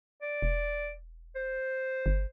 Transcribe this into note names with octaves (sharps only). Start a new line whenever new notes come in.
D5
E1
C5
G1